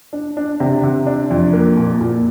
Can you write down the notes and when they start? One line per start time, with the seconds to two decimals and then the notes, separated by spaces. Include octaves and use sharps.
0.13 D4
0.37 D4
0.60 C3
0.84 C3
1.07 D4
1.30 F2
1.53 A#3
1.77 A#2
2.01 A#2